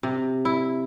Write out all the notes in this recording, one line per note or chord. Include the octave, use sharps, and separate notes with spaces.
C3
E4